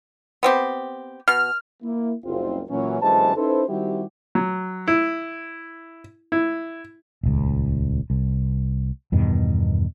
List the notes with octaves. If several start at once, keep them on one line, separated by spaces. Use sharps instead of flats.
B3 C4 G4
B2 F6
A#3 E4
F#1 C2 C4 F4
A#2 E3 F#3 C#4
G1 F#2 E3 G#3 C5 A5
C#4 D#4 E4 A4 B4 C5
D#3 G3 C4 E4 F#4 G4
F#3
E4
E4
D#1 C#2
C2
E2 G2 B2 D#3